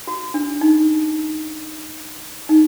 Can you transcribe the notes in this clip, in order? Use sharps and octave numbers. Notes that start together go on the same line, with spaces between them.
F#4
D4
D#4
D#4